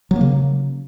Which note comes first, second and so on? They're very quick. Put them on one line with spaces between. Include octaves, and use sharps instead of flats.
F#3 A#3 C#3